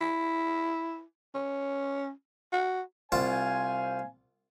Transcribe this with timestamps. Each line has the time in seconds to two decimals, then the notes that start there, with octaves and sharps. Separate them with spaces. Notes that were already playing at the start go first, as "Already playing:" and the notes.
0.01 E4
1.35 C#4
2.53 F#4
3.12 C2 F4 C5 F5 G#5 A5